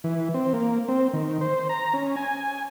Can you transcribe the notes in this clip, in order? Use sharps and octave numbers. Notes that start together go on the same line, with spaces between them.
E3
C4
A#3
C4
D#3
C5
A#5
C#4
G#5